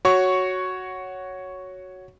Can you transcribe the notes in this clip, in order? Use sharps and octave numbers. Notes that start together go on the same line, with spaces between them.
F#4 C#5 C#6